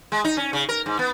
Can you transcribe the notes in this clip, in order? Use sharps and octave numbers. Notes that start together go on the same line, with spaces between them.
G#3
D#4
C#4
C#3
A#4
G#2
B3